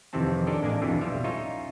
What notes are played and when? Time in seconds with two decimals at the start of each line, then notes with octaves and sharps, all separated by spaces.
0.13 F2 C3 D#3 E3 C4 A5
0.47 C#4 D4 A4 A#4 D5 D#5
0.62 A1 G#3 A#3 D4 D5 G#5
0.82 F2 B2 D3 E3
1.01 B1 G3 F4 E5 F5
1.24 C#4 D#4 F4 C#5 D#5 E5